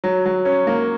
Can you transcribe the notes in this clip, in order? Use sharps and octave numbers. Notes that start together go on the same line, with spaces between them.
F#3
F#3
C#4
A#3